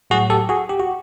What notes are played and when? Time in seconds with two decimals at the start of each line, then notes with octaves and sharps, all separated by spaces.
0.10 A2 F#3 F#4 G#4
0.30 G4 A4
0.49 F#4 G#4
0.70 G4
0.80 F#4